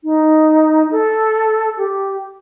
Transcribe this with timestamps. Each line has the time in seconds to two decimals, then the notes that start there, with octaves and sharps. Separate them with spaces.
0.04 D#4
0.91 A4
1.78 G4